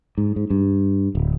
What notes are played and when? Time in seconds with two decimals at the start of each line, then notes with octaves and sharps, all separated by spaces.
0.18 G#2
0.36 G#2
0.50 G2
1.15 D1